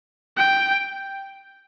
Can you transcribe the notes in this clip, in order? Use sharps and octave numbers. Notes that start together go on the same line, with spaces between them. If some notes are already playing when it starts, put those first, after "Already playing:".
G5